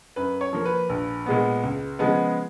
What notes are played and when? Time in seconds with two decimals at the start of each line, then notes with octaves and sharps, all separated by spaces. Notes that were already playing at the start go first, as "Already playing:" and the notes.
0.16 F#2 B4
0.41 C#5
0.53 F3 A#3
0.65 B4
0.89 A#1
1.26 A#2 G#3 B3
1.63 C#2
1.99 C#3 F3 G#3 B3